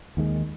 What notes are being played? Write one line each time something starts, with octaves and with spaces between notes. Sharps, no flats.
D#2 D#3 G#3